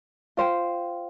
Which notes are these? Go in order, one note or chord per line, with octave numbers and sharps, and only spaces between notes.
F4 C5 G5